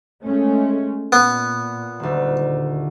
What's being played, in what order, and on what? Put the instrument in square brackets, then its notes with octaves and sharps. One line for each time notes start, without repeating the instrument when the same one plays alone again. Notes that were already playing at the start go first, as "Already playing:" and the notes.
[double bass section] G#3 A3 C#4
[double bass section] A#2 [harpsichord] B3
[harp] D#1 D2